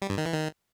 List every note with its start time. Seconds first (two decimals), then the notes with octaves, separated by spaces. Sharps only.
0.02 G3
0.10 G2
0.18 D#3
0.26 E3
0.34 D#3